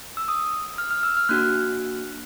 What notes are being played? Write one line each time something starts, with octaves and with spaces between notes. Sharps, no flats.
E6
D#6
F6
F6
E6
F6
A#3 D4 F#4 F#6